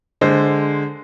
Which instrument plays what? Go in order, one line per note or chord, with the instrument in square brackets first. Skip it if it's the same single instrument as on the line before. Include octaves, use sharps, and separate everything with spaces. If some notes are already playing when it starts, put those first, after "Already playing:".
[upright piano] D3 G#3 C5